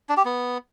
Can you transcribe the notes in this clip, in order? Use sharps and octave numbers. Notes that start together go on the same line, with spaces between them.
D4
G4
B3